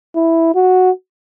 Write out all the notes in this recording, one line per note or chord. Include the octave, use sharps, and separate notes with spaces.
E4
F#4